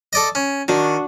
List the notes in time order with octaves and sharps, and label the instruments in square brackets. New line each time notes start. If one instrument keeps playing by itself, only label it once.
[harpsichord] A4 D5 D#5
C#4
[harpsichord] D#3 [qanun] D4 F#4